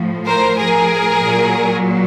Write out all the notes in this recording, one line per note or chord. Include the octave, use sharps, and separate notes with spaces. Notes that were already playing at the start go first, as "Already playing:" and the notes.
Already playing: A2 F3
A#4 C5
G#4 A#4
A#2 F#3